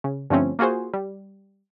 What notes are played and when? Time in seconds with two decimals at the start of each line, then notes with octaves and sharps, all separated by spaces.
0.04 C#3
0.30 G2 D3 F3 A3 C4 C#4
0.59 A#3 F4 F#4 G#4 C5
0.93 G3